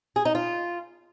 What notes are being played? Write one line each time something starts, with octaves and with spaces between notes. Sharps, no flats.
G#4
D#4
F4